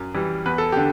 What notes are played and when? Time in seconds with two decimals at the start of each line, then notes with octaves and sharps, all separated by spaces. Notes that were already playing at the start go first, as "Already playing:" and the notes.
Already playing: F#2
0.14 E3 G3
0.45 E2 B4
0.58 A4
0.72 D3 G4